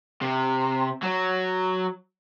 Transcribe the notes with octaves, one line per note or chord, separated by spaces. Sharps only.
C3
F#3